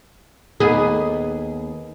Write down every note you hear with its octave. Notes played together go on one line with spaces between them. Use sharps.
D#2 B3 G#4